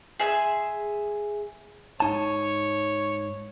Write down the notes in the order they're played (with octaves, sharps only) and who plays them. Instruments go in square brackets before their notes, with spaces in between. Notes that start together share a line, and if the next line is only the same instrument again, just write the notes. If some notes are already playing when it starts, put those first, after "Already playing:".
[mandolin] G#4 E5 C6
[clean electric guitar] G#2 D#4 A5 [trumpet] C#5